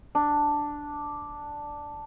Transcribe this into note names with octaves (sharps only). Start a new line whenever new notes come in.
D4